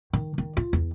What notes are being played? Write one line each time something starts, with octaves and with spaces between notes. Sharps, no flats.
D#3
D#3
F4
E2